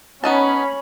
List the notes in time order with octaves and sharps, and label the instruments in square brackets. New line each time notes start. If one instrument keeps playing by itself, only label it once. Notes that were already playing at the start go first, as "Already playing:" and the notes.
[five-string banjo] B3 D#4 A5 [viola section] C#4 B5